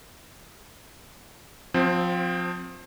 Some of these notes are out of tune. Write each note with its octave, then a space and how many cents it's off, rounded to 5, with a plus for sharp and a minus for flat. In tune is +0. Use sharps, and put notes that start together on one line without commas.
F3 +25 C4 -5